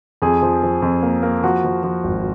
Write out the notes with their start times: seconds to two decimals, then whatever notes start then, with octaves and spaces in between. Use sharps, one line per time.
0.22 F2 G#4
0.42 F3
0.63 F3
0.82 F2
1.03 A#3
1.23 A#3
1.43 F3 F#4
1.64 F3
1.83 F3
2.04 G#1